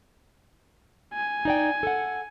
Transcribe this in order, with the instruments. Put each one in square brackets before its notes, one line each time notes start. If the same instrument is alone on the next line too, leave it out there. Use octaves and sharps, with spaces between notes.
[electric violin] G#5
[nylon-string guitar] D#4 D5 G5
A4 F#5